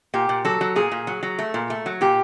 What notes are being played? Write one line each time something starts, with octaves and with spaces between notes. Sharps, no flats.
A#2 G4
A#2
F#3 A4
F#3
A#2 G#4
A#2
F#3
F#3
A3
A#2
A3
F#3
A#2 G4